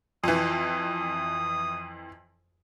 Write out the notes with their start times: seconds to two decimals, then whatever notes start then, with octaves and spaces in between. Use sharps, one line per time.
0.24 F2 E3 D#6